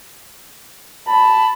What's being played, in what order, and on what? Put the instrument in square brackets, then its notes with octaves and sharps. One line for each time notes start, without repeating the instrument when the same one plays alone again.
[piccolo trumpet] A5 [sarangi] B5